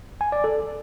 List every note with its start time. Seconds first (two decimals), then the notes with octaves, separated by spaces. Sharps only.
0.21 G#5
0.32 D5
0.44 A4